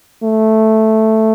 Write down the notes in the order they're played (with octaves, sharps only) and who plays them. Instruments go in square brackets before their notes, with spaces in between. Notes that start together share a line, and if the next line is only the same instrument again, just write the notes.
[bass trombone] A3